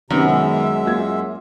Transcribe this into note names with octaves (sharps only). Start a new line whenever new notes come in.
F#2 C3 D#3 B3 A#5
G#3 E5
A#3 F4 G#6